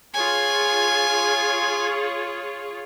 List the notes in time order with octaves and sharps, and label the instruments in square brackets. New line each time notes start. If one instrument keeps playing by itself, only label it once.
[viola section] F4 G#4 C#5 [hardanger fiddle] G#5